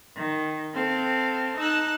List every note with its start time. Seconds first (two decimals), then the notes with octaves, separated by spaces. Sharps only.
0.15 D#3
0.74 C4 A4 F5
1.58 D#4 A5 E6 F#6